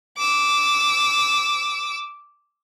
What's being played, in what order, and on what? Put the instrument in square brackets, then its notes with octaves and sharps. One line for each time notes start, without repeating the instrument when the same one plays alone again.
[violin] D6 E6